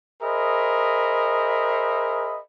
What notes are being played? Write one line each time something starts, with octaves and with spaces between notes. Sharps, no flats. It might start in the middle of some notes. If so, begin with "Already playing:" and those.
G#4 A#4 C5 D#5 E5 B5